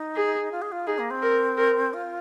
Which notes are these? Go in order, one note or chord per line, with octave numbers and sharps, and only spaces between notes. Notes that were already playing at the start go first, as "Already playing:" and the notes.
Already playing: D#4
G#4
F4
G#4
F4
D#4 G#4
A#3
C4
A#4
A#4
F4